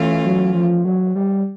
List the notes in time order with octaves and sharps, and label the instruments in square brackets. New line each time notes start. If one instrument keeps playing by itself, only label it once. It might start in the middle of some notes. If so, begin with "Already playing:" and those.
Already playing: [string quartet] E3 A3 C#4 F4
[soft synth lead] F#3
F3
F#3
G3